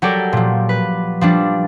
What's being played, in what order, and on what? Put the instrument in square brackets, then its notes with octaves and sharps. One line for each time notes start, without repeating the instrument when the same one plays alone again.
[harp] F#3 G3 G4 A4 A#4 D5
A#2 F3
B4
F3 G3 D4